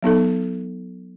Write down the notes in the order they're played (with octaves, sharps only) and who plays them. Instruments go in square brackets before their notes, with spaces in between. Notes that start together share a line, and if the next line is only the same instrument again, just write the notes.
[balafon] F#3 B3 D#4 A4